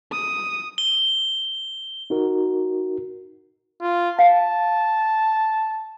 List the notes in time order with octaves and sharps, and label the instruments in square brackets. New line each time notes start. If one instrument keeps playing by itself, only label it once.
[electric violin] D#6
[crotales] G7
[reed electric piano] D#4 F#4 A#4
[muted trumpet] F4
[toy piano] F5 [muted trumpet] A5